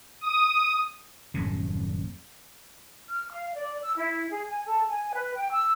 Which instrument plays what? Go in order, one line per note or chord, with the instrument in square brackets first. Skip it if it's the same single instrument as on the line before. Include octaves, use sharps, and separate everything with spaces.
[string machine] D#6
[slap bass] D#1 F#2 A2 C3
[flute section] F6
F5
D5
E6
E4
G#4
G#5
A4
G#5
B4
G5
E6